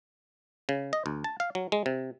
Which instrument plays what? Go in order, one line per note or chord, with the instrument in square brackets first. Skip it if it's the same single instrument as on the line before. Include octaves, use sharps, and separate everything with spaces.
[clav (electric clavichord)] C#3
D#5
D2
A5
F5
F#3
G#3
C3